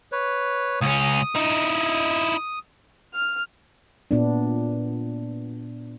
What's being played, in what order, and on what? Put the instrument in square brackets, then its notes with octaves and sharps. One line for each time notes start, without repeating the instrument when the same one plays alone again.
[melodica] B4 C#5
[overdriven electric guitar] C#2 C#4 [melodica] D#6
[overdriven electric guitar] D#4 E4
[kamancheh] F6
[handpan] A#2 B3 D4